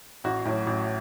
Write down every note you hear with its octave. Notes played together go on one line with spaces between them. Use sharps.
A1 F#4
A2 F#3
A1